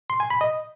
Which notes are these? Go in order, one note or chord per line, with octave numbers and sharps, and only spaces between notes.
C6
G#5
B5
D#5